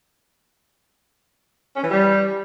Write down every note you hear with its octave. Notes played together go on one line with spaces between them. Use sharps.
C#4
E3
G3